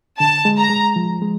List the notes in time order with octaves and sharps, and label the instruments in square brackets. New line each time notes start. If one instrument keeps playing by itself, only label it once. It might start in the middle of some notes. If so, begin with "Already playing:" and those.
[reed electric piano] D3 [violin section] A5
[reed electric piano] G#3
[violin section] A#5
[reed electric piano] G#3
F3
G#3